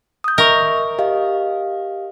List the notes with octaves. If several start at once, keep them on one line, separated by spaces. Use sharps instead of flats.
D#6 G6
A#4 D#5 E5 C#6
G4 D#5 F5